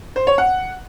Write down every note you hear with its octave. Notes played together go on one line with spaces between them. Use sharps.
C5
C#5
F#5